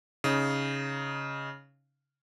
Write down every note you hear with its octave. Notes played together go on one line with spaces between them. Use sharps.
C#3 D#4